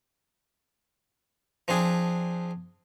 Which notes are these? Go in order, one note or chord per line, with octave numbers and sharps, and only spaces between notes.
F3 C4 D4 G#4